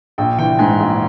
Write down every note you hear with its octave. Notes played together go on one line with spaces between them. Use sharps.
A#1 G5
E3 G5
G#2 G#5
A#1